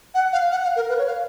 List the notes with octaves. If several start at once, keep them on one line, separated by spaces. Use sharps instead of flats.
F#5
F5
F#5
F5
A#4
B4
C#5
F5